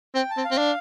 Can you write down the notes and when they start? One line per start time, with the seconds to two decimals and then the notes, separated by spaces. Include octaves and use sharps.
0.15 C4 G5
0.30 A5
0.37 C4
0.45 F5
0.51 C4
0.58 D4